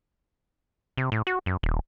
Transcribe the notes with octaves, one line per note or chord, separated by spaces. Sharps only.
C3
A2
F#4
F#2
D#1